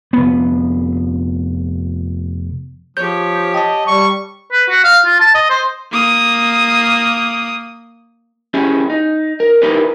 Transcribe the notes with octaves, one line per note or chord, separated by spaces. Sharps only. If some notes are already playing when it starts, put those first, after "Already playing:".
F1 B3
F3 G4 C#5 G6
D#5 G5 A5
G3 C#6
B4
F#4
F5
F4
A5
D#5
C5
A#3 D#6
C#4 E4 G4 G#4
D#4
A#4
D#4 E4 G4 A#4 B4